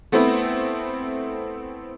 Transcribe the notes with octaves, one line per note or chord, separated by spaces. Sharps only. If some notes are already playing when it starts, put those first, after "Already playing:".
A3 B3 C4 E4